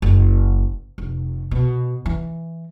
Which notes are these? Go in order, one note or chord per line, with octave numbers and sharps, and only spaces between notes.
F#1
F1
B2
E3